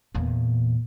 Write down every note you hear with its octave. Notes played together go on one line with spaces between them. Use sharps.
E2 A#2